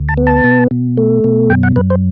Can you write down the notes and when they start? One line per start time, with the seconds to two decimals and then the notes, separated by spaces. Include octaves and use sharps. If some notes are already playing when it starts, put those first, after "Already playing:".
Already playing: D2
0.09 A5
0.17 B3
0.27 A5
0.44 B2
0.71 B2
0.97 A3
1.24 B2
1.50 F#2 G5
1.63 F#5
1.76 F#2 B4
1.90 C5